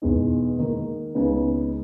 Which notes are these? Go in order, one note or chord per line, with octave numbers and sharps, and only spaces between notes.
E2 B2 G#3 D#4
D#3 A#3 D#4 A#4
C#2 C#3 G#3 B3 D#4